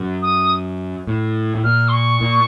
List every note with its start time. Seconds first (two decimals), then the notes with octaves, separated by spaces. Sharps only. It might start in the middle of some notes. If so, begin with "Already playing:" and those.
Already playing: F#2
0.22 D#6
1.07 A2
1.55 A2
1.64 A#2 F6
1.88 C6
1.92 C#6
2.21 A#2